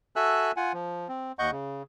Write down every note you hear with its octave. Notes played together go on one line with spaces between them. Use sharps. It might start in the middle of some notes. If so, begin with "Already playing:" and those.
F#4 A4 E5 G#5 E6 F#6
F4 F#5 G#5
F3
C4
D#2 D#5 F#5 C#6 G6
C#3